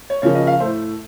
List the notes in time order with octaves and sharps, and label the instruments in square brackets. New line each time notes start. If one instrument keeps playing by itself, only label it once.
[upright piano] C#5
C#3 F3 A#3 C#5
D#5
F5
A2 A3 C5